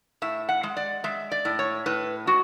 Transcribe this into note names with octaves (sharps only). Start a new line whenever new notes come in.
A2 E5
F#5
G#3
D5
G#3 E5
D5
A2
C#5
A2 B4
G#3 F#4